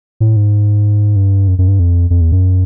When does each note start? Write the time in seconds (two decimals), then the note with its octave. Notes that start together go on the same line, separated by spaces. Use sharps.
0.20 A2
0.36 G#2
1.16 G2
1.48 F#2
1.58 F#2
1.68 G2
1.79 F2
2.10 F2
2.21 E2
2.32 F#2